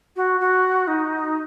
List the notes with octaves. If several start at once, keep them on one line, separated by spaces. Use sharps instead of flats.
F#4
F#4
D#4